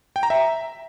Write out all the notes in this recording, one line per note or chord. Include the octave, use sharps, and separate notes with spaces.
G5
A#5
E5